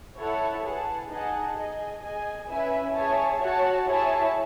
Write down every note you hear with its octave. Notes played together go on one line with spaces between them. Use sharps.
E4 A4 C#5 F#5 A5
G#4 B4 F#5 A5
D#4 G#4 D#5 F#5 A5
G#4 D#5 G#5
G#4 D#5 G#5
C#4 E4 B4 E5 G#5
G#4 C#5 E5 A5
F#4 C#5 F#5 A5
E4 G#4 C#5 E5 A5